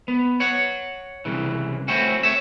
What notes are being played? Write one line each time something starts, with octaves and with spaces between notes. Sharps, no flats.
B3
C#5 F#5
C2 C#3 E3
A3 C4 C#4 E4 F#4
C#5 E5